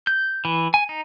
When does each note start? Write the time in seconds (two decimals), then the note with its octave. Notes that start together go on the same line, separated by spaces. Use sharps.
0.07 G6
0.45 E3
0.74 G#5
0.89 D#4